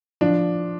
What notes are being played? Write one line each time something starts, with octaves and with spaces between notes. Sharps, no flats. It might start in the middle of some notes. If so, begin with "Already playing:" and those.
F3 D4